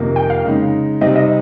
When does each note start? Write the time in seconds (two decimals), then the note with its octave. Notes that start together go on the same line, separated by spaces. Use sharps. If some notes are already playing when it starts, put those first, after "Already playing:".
Already playing: F2 C3 D#3 A#3 D#4
0.16 G5
0.30 F5
0.44 C#3 G#3 D#4
1.01 C3 G3 C4 D#4 D#5
1.16 D#5